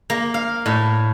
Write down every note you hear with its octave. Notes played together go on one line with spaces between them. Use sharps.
A#3
F5
A2